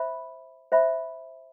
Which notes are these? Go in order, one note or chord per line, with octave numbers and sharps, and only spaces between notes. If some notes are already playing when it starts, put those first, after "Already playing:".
Already playing: C5 E5 B5
C5 E5 B5